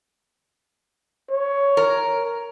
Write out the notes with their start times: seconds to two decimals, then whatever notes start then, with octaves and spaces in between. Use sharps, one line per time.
1.30 C#5
1.77 A#4